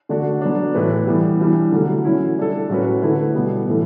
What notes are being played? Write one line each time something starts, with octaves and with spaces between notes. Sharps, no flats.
D3 A3 D4 F#4
F#3 B3 D4
A2 E3 A3 E4 B4
E3 G3 B3
E3 G3 D4
D3 F#3 A3
F#3 C#4 E4
G3 D4 A4
A2 F#3 C#4 F#4 B4
D3 A3 E4 B4
B2 G3 B3
A2 E3 A3